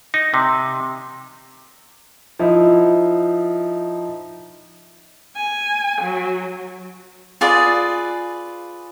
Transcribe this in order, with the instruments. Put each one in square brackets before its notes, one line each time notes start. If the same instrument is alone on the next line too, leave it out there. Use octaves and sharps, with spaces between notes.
[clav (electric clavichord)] D#4
C3
[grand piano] F3 D#4 E4
[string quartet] G#5
F#3
[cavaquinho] F4 G#4 B4 D5